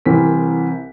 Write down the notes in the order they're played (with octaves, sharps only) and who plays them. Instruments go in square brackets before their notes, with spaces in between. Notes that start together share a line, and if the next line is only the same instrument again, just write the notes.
[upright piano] C2 E3 C4 A#4 B6